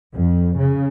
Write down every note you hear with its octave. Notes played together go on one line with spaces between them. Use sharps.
F2
C#3